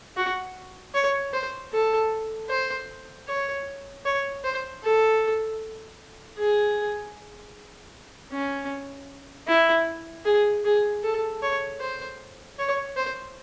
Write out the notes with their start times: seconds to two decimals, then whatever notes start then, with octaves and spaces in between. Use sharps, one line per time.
0.17 F#4
0.94 C#5
1.33 C5
1.73 A4
2.50 C5
3.28 C#5
4.05 C#5
4.44 C5
4.83 A4
6.38 G#4
8.32 C#4
9.47 E4
10.25 G#4
10.65 G#4
11.04 A4
11.42 C#5
11.80 C5
12.59 C#5
12.97 C5